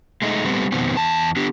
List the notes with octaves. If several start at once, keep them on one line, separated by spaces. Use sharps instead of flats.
G#3 A3 D#4
G3 A3 B3 C4
F2 B2 D#3 B3 C4
E2 A5
B3 D4 G4